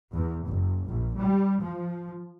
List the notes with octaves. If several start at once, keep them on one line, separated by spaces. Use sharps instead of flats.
E2
F#1
A#1
G3
F3